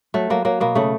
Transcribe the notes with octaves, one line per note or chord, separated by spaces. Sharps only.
F#3 A3
F#3 A#3
F#3 A#3
B2 A#3
C#3 A3